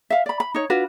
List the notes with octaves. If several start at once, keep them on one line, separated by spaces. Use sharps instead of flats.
E5 F5
D5 B5
B5
D#4 C#5
D4 F4 F#4 B4